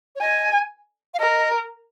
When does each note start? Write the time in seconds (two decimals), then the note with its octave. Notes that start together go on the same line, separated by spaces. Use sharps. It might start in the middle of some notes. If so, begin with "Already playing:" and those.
0.16 C#5
0.21 D#5 G#5
1.14 F5
1.20 A#4 D#5